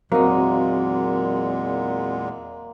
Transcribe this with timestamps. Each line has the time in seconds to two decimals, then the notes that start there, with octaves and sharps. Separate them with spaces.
0.12 E2 A#2 F#3 G#3 A#3 C4 D#4 F#4